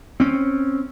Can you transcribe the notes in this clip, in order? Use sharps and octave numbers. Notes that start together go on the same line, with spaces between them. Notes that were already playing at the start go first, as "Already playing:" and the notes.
C4 C#4